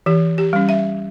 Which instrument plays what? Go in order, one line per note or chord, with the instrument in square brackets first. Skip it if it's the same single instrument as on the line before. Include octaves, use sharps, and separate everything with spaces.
[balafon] E3 G4
G4
G3 C#4
E5